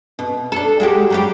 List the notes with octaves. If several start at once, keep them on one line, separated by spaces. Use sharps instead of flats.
B2
D4 A4
G#3 F#4 G4
F#3 G3 G4